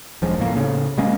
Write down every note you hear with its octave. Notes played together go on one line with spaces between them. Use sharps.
E1 F3 G#3
C#2 A2 A#3
A2 C#3
C3 G#3 A#3 C#4